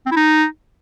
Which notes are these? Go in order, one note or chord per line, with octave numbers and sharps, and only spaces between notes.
C4
E4
D#4